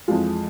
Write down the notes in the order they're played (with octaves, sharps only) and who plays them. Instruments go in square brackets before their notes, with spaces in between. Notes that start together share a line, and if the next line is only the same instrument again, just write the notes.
[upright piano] F2 E3 G#3 F4